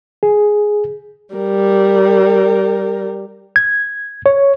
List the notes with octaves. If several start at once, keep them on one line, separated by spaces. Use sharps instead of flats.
G#4
G3 A#4
G#6
C#5